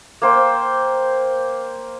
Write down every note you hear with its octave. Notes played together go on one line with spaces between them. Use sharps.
A#3 C5 G5